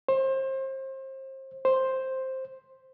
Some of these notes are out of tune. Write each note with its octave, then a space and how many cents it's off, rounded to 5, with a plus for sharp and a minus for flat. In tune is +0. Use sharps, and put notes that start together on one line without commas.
C5 +30
C5 +5